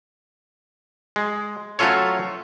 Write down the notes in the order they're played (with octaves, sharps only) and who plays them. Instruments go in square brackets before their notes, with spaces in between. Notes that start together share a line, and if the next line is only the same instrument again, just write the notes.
[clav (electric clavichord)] G#3
F#3 A3 C#4 F4 A4 C#5